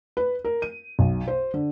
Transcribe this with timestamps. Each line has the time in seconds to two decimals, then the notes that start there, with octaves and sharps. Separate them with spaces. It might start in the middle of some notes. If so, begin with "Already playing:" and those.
0.17 B4
0.45 A#4
0.62 D#7
0.99 B1
1.28 C5
1.54 D3